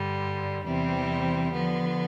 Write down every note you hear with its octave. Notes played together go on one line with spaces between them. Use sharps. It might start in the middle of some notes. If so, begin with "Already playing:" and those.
Already playing: G2 D3 G3
E2 C3 E3 G3 C4
D3 F3 B3